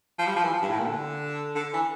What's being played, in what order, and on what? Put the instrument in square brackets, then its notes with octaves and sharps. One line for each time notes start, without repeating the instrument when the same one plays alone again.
[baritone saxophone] F3
G3
F3
E3
F3
G2
A2
A#2
D3
D3
E3